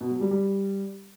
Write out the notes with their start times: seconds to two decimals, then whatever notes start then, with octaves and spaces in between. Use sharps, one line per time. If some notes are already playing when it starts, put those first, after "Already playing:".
0.01 B2
0.11 F#3
0.21 G3
0.31 G3